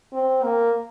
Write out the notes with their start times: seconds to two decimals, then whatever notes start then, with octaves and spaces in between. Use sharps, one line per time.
0.13 C4
0.44 A#3